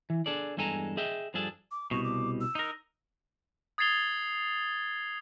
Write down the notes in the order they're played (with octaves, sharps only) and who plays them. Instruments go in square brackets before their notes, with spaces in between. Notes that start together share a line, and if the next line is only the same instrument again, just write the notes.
[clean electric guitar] E3
D4 G#4 A4 D5
E2 G2 G#3 A4 G#5 A#5
G#4 D#5 E5 G5
G2 F3 D4 G#4 A4
[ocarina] D6
[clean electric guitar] C2 B2 [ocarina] C#6
[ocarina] D6
E6
[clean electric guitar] D#4 A#4
[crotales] D#6 G#6 A6 C7 F7 G7